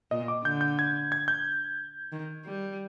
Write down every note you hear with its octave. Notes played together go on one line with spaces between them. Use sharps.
A#2 D#5
D6
D3 G6
G6
G#6
G#6
G6
D#3
G3